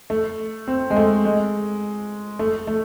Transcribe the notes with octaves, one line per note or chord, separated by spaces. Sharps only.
A3
C4
G#3
A3
G#3
A3
A3